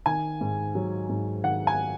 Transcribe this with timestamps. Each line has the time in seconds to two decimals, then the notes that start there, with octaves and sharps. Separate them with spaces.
0.06 D#3 G#5
0.41 G#2
0.75 F#3
1.09 G#2
1.44 D#3 F#5
1.67 G#5